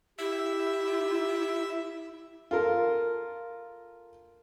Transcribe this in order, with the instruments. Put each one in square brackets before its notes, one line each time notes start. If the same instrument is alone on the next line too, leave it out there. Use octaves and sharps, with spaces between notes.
[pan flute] E4 [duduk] G4 [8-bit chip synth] E5
[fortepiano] F4 A4 A#4